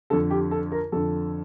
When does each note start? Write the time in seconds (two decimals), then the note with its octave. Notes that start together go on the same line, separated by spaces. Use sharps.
0.10 F2 D3 A4
0.30 G4
0.51 A4
0.72 A#4
0.92 F2 D3 A4